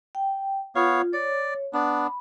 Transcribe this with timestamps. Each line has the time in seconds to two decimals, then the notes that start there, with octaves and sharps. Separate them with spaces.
0.15 G5
0.76 B3 F4 C#5 F5
1.13 C#5 D5
1.74 B3 D4 B5